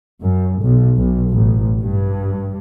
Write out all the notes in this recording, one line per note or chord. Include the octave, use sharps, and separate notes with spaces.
F#2
B1
B1
A1
G2